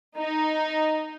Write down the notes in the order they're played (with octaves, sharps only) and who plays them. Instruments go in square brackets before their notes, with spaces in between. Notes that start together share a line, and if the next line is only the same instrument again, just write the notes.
[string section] D#4